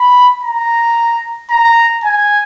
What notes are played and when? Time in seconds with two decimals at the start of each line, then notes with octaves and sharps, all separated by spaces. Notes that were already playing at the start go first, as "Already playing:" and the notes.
Already playing: B5
0.44 A#5
1.50 A#5
2.04 G#5